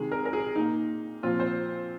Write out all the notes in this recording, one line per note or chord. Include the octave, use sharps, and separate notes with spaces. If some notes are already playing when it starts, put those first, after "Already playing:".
Already playing: C3 D#3 G#3 G#4
A#4
A#4
G#4
A#2 A#3 D#4
A#2 F3 C4 F4
C5